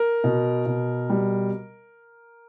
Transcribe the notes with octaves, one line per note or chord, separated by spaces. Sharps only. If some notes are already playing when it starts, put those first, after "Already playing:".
Already playing: A#4
B2
B2
G3